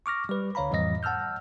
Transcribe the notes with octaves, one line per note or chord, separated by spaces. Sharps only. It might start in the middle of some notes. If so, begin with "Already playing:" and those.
C#6 D6 F6 A#6
G3 B4
D2 D3 C#5 F5 A#5 B5
F2 A2 E3 G3 D#5 A#6
F#5 A5 E6 F6 G6